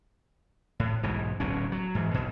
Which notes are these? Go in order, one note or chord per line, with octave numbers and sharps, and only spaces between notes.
A2
B1 G#2 B2 E3
D1 B1 B2 C#4
F#3
G#2 E3
B1 B2